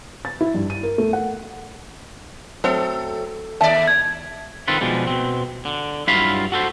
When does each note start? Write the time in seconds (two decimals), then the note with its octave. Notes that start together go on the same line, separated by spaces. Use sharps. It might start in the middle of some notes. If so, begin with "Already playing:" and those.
0.25 A6
0.41 E4
0.54 G2
0.70 D#7
0.83 A#4
0.98 A3
1.13 F#5
2.64 F#3 A3 C4 A4
3.61 D#2 D5 E5 A5
3.88 G#6
4.68 D#3 C4 F4 A4 B4
4.81 B2 F3 G3 G#3
5.07 B2 C4
5.65 D3
6.08 G2 F#3 E4 F4 F5 B5
6.52 F#4 A4 C5